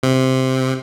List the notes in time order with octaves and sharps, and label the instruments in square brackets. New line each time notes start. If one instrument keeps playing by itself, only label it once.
[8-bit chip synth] C3